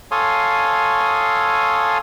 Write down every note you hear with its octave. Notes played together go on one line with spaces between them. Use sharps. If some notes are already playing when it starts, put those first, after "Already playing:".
A4 C#5 F5 G#5 C6 D#6